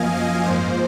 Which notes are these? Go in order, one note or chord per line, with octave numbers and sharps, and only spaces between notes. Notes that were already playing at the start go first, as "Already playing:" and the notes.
Already playing: F#2 F3 A#3 D#5 F5 G#5
D#5
G#2 F3 A#3 C5